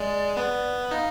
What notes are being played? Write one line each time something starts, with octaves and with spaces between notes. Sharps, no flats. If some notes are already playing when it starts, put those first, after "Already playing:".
Already playing: G#3 D5
B3
D#4 F5